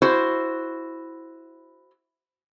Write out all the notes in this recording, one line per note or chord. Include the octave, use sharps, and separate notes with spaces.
E4 F#4 C5